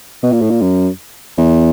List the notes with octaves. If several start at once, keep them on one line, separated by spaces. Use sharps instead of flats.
B2
A#2
A2
A#2
F#2
E2